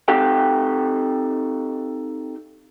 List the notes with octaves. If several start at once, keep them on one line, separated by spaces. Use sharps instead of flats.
C4 D#4 G4 A4 F5 G5